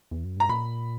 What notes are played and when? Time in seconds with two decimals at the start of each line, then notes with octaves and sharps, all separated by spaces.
0.11 E2
0.24 F#2
0.37 G2 A#5
0.49 A#2 B5